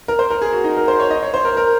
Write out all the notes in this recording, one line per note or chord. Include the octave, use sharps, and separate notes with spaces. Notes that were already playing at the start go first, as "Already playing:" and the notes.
A#4
C5
A#4
G#4
F#4
D#4
A#4
C5
C#5
D#5
C#5
C5
A#4
A#4